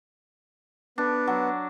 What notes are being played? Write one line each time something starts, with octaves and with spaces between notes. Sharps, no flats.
B3 D4
F#3